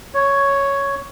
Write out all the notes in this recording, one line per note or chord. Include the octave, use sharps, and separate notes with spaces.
C#5